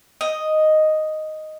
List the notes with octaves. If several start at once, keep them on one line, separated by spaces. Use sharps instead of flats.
D#5